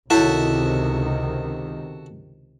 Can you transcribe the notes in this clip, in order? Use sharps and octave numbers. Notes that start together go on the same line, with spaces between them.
C#2 C3 D#3 E4 F#4 A4 C#5 E5